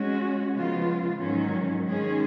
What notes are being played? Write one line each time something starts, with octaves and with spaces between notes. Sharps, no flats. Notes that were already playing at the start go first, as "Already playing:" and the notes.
Already playing: G#3 C#4 F#4
C#3 F3 G#3 B3 F4
G#2 D#3 F#3 C#4
D#3 G#3 C#4 G#4